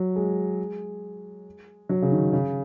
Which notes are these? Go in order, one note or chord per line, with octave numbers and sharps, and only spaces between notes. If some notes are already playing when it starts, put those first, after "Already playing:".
Already playing: F#3
G#3
F#3
C#3
D#3
C#3